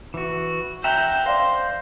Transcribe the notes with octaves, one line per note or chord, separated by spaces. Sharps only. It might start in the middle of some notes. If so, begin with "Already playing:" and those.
E3 F#4
E5 F#5 G5 A#5 G6
C5 D5 F5 A#6